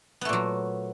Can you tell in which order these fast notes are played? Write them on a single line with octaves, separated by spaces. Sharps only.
B3 A3 A#2 F#3